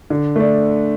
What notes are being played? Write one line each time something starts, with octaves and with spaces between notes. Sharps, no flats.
D3
A3 D4